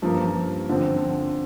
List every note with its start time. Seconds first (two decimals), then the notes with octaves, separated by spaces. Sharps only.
0.02 G2 F3 A#3
0.69 D3 F3 C4